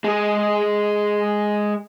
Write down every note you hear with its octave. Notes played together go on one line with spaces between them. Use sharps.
G#3 G#4